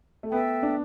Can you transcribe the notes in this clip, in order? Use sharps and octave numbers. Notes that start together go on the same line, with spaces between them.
A3
B3 A4 E5 G5
D4